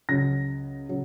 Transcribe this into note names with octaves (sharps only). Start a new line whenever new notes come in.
C#2 C#3 F#3 A#6
C#3 F#3